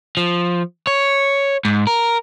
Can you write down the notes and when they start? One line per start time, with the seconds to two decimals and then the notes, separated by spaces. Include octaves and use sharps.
0.17 F3
0.87 C#5
1.65 G#2
1.87 A#4